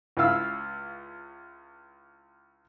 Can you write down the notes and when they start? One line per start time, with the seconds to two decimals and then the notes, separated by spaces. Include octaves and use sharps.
0.17 C#2 E4 F5 E6